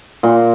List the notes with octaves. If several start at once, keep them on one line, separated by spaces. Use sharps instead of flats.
A#2